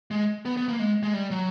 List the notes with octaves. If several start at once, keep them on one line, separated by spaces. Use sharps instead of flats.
G#3
B3
B3
A#3
G#3
G#3
G3
F#3